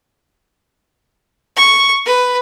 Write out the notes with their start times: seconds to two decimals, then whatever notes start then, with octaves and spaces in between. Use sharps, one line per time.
1.56 C#6
2.05 B4